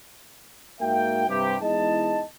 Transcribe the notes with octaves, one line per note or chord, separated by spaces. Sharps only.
G#2 A#3 F#4 E5 G5
G2 C3 G4
E2 G#3 D#4 E4 D#5 A5